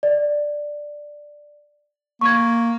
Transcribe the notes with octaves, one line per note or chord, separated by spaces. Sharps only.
D5
A#3 C#6 G#6